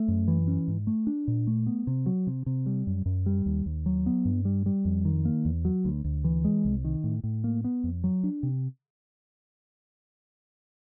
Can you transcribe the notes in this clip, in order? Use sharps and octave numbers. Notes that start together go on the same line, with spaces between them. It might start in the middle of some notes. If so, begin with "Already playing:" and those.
Already playing: A3
F#2
E3
C#4
G#2
A3
D4
A#2
A3
B3
C3
F#3
C3
C3
G3
F#2
F#2
G3
D#2
D#2
F#3
B3
G2
G3
G3
F2
D#3
A#3
E2
F#3
D2
D2
E3
G#3
C2
D#3
A2
A2
A#3
B3
F2
F#3
D4
C3